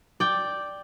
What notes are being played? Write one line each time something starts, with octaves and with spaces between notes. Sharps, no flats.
D5 G5